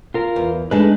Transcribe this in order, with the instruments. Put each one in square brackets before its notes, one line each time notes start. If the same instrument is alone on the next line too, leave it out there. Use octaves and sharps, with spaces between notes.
[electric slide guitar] F4 A#4
[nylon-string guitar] E2
[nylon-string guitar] G#3 D4 [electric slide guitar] A3 D#4 B4